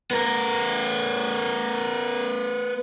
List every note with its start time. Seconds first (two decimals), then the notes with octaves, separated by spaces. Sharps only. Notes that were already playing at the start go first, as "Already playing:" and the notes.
0.11 B3 A#4